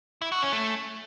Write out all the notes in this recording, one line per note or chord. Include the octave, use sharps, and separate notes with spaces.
E4
F#4
C#4
A3